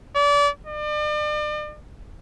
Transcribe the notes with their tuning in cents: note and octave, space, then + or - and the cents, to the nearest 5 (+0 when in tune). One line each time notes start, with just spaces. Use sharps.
D5 -30
D5 +40